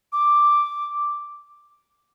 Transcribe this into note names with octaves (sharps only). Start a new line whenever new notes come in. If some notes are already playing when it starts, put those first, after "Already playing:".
D6